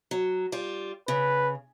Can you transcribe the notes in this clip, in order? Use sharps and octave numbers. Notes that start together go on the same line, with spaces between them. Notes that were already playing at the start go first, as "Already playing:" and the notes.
F#3
G3 F4
C#3 B4